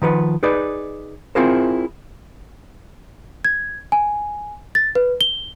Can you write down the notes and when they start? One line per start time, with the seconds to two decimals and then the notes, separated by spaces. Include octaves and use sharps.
0.02 D#3 F3 B4 F#5
0.43 D#4 G#4 B4 D5
1.35 C4 E4 F4 G#4 A#4 C5
3.45 G#6
3.92 G#5
4.75 A6
4.95 B4
5.21 G7